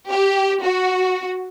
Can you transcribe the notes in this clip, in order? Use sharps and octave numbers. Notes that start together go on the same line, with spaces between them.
G4
F#4